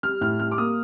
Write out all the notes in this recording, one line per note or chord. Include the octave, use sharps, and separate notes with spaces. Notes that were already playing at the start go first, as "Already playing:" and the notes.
G3 F6
A2 F6
G3 F6
D6
A#3 D#6